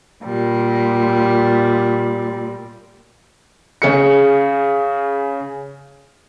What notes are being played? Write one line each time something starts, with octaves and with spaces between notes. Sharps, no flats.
A#2 G3
C#3 G#4 C#7